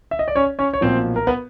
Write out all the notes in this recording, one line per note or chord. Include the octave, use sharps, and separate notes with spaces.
E5
D#5
D5
C#4 C#5
C#4 C#5
C#5
B1 A#2 F3 C4 C5
A#4
B3 B4